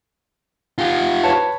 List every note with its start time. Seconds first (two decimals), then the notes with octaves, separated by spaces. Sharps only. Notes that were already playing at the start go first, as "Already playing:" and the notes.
0.78 F4 G4
1.24 B4 C#5 A5